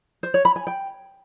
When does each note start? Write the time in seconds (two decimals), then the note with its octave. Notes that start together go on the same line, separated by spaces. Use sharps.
0.23 C5
0.34 C#5
0.45 B5
0.56 G#5
0.67 G5